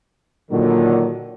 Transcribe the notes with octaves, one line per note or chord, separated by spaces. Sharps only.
A#2 D3 D#3 F#3